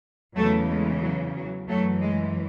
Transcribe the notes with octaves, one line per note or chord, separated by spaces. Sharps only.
E2 C#3 E3 F#3 A3
G#3
F#3
F#3
F#2 E3 F#3 A3
G#3